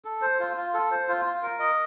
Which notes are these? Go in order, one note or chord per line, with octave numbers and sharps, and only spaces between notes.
A4
C5
F4
F4
A4
C5
F4
F4
A#4
D#5